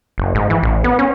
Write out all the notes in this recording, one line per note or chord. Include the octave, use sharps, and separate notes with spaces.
F#1
G#2
E3
A1
B3
C#4